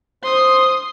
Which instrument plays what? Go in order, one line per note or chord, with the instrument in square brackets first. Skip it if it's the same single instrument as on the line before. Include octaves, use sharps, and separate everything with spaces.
[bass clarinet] C5 [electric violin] C6 D#6